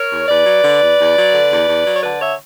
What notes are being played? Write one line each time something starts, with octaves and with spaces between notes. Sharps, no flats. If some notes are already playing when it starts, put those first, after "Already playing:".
Already playing: A#4 C#5
E2
E2 B4 D5
F#3
D3
E2
E2
F#3
D3
E2
E2
F#3
C#5
D3 B4 D5
C#5 E5